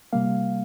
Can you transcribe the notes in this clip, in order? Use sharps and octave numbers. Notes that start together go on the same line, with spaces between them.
C3 G3 A#3 F5